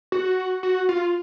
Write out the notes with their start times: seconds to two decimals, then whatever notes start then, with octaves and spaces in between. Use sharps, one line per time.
0.12 F#4
0.63 F#4
0.89 F4